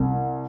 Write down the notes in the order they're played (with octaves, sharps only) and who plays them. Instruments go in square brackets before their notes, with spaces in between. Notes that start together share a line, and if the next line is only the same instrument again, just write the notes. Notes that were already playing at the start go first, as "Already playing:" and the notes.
Already playing: [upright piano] C2